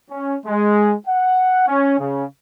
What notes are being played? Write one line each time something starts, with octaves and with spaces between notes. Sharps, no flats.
C#4
G#3
F#5
C#4
C#3